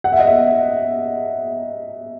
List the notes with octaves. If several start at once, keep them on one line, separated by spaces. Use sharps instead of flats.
F#5
E5
D#5
E5